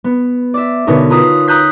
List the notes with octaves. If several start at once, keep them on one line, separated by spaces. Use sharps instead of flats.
B3
D5 E5
B2 D3 B3 C#4 D#4 A#4
F4 B4 A#5 D#6
A#5 D#6 F#6 G6 B6